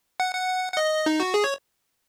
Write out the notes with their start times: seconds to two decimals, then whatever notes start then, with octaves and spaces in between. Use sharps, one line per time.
0.20 F#5
0.35 F#5
0.73 F#5
0.77 D#5
1.06 D#4
1.20 F#4
1.34 G#4
1.44 C#5